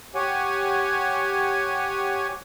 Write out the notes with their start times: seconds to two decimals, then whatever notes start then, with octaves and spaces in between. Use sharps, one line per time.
0.15 G4 C#5 F#5 G#5